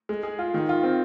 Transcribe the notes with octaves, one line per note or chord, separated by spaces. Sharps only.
G#3
G#4
F4
D#3
F4
C4